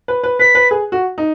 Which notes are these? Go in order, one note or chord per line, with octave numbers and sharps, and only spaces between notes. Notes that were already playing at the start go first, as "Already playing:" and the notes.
B4
B4
B4 B6
B4
G#4
F#4
D#4